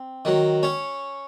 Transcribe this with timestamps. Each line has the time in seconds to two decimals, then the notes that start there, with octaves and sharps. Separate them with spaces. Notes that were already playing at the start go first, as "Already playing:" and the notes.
Already playing: C4
0.25 D#3 F#3
0.63 C#4 C#5